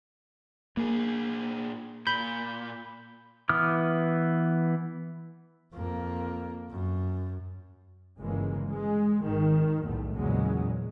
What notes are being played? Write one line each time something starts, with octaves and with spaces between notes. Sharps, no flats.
A#2 A#3 G#4
A#2 B5 G6
E3 B3 D6 D#6 F6
F2 A#3
F#2
G1 C#3 E3 G#3 A#3
G#3
G#1 D#3
B1 E2 A2 D#3 A3
E2 A#2 C#3 F#3 G#3